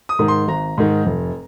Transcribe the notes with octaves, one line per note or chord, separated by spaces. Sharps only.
D#6
G#2 D#3
C6
G#1 A#5
G#2 D#3
F1